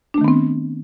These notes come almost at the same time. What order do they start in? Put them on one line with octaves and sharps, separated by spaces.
D4 A3 D#3 B3 C4